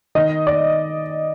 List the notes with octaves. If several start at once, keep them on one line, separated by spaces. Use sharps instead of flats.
D#3 D#5
D5